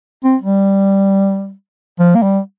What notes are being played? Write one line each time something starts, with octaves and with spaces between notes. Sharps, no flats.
C4
G3
F3
A#3
G3